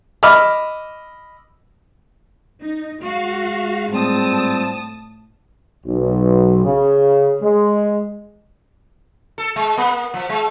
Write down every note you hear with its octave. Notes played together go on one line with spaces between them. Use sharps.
D#5 B5 D6 E6 F6
D#4
G#3 F#4 F5
A2 F3 G3 C4 A5 D#6
B1
C#3
G#3
A4
G#3
A#3
F3
G#3